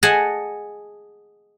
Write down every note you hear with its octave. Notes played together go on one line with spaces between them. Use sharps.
G#4 D#5 F#5 G#5 A5